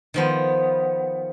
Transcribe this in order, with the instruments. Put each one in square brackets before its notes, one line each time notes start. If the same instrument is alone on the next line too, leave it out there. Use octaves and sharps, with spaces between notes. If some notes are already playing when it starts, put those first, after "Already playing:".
[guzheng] D#3 F3 B3